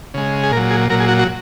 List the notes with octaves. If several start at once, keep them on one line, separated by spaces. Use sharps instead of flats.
C#3 G#3
G#4
A#2 A#4
F#3
G#4
A#2 F#3 A#4
G#4
F#4
F#4